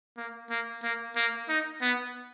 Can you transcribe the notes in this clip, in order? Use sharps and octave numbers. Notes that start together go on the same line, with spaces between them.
A#3
A#3
A#3
A#3
D#4
B3